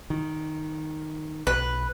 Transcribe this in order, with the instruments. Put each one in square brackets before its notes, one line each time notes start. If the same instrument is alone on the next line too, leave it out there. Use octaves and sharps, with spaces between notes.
[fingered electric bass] D#3
[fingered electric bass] B1 [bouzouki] B4